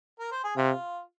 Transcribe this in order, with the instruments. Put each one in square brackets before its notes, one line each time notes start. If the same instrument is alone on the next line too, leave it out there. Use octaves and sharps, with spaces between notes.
[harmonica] A#4
C5
G#4
[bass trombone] C3 [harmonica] F4